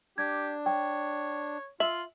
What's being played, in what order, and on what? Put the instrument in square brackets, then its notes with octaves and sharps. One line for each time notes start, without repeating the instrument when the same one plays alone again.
[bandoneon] D4 [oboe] G4 [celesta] G#6
[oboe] C#5 [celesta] G5
[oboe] F4 [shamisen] E5 [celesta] F#7